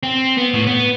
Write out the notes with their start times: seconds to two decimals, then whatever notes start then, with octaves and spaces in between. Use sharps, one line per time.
0.03 C4
0.37 B3
0.54 A2
0.67 B3